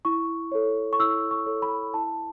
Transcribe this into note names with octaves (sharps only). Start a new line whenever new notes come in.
E4 C#6
A4 C#5
C#6
E4 E6
C#6
A4 C#5
B5
E4 A5